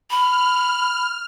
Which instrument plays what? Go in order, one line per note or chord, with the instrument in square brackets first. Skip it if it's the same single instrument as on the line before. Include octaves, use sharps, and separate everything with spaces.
[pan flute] B5 [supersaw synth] F6